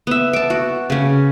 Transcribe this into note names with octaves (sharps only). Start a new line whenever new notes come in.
B3 E5
A5 D6
F#4
C#3 C#4